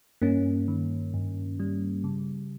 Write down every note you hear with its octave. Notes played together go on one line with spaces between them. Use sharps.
G2 A#3 C#4
D#3
G2
G3
C#3